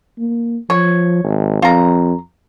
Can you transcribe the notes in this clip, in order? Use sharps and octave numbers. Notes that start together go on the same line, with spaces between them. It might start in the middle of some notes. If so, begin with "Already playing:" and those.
A#3
F3 C#5
G#1
F2 F4 A#5